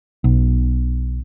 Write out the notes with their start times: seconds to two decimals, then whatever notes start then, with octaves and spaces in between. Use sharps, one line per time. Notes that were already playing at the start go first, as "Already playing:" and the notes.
0.24 B1